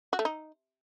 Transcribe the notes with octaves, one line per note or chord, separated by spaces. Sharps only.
F#4
A3
D#4